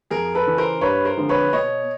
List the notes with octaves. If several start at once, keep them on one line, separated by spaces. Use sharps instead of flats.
F2 G#4 A#4
A4 B4
C#3 E3
A#4 C5
G2 B4 C#5
A#4 C5
D3 F3 G#3 C4
B4 C#5
B2 C#5 D#5